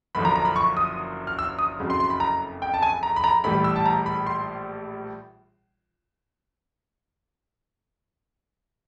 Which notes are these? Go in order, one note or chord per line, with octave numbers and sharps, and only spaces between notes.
F#1 F#2 D3 F3 B5
A#5
A#5
B5
C#6
D#6
F6
E6
D#6
F#1 F2 C#3 F#3
C6
C6
B5
A#5
G5
A5
G#5
A#5
B5
A#5
A#1 A2 E3 G3 B5
E6
A5
A#5
B5
C6